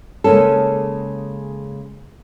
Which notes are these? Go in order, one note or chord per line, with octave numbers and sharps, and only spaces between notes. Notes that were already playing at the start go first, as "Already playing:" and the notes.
C#3 G#3 A#3 C#4 A4